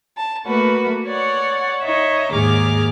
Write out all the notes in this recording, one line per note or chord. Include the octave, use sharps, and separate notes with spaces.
A5
A3 A#3 F#4 B4
C#5 D5 F#5
D#4 C#5 D#5 E5
D#2 G#2 D#3 G#4 D6 F6